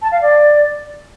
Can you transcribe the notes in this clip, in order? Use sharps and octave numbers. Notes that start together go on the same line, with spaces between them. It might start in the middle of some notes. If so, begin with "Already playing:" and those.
A5
F5
D5